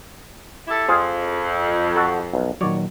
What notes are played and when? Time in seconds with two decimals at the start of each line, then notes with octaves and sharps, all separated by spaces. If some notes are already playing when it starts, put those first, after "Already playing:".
0.68 E4 G4 A4
0.89 F2 F4 G#4 C5
1.96 F#4 A4
2.33 B1
2.61 A#2 D#3 F#3 C#5 D5